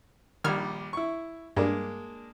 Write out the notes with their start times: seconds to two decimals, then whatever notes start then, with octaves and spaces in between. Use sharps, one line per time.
0.44 A#1 D#3 G3 F6 G#6
0.93 E4 C#6
1.56 G2 G#3 A#3 D4